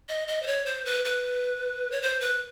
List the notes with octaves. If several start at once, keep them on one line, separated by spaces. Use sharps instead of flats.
D#5
D#5
C5
C#5
C5
B4
B4
C#5
C5
B4